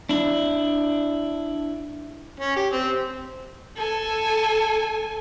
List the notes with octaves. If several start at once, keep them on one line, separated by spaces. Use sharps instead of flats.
D4 E4
C#4
G4
C4
A4 G#5